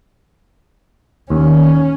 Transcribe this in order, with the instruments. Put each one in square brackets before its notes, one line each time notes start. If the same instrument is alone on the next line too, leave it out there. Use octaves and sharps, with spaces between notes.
[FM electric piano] D#2 [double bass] C#4